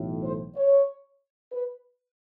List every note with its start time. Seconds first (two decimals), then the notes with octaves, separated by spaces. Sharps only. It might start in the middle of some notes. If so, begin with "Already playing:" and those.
Already playing: B1 A2 E3
0.23 C5
0.56 C#5
1.53 B4